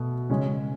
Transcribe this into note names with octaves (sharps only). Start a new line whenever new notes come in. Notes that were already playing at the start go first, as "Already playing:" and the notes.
Already playing: B2 A3
C#3 G#3 C#4